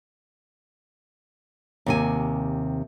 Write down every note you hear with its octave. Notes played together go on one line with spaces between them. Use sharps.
D#2 C3 G#5